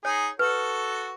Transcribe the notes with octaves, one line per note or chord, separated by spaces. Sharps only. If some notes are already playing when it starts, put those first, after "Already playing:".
D#4 G#4 C#5
F#4 A4 B4